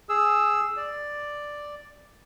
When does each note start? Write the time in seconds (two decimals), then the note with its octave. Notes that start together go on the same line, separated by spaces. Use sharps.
0.09 G#4 E6
0.77 D5